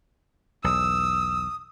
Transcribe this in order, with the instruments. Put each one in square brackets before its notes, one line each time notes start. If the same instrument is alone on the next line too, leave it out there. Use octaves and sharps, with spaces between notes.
[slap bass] B1 E2 [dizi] D#6 [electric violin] E6